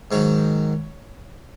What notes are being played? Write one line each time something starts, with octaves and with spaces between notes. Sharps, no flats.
G#2 D#3 F#3 C#5